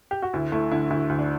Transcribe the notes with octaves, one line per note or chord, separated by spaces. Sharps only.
G4
F#4
D2 E4
A3 E4
D3 E4
D2 E4
D2
D4